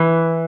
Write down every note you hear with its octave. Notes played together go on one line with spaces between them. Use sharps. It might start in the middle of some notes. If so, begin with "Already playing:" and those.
Already playing: E3